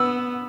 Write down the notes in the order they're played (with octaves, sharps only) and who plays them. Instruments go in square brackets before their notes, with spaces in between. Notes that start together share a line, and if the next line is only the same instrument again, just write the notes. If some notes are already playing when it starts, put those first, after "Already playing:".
Already playing: [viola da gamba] B3 [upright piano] E6